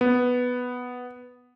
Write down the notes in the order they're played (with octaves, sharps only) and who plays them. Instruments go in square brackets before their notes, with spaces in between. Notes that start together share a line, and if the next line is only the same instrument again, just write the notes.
[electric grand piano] B3